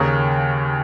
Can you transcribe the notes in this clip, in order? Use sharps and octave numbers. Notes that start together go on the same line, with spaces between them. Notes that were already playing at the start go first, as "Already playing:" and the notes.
Already playing: D#2 C#3 A#3 C#4